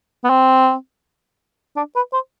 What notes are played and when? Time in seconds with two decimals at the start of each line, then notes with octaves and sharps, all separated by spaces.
0.24 B3
0.30 C4
1.76 D4
1.96 B4
2.13 C5